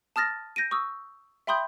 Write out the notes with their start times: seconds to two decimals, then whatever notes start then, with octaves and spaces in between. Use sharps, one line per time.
0.16 A5 D#6 F6 A6 A#6
0.56 G6 A#6 D7 D#7
0.71 C#6 D#6 E6
1.47 E5 G5 B5 C6 D#6 G6